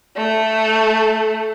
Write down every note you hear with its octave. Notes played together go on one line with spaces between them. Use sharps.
A3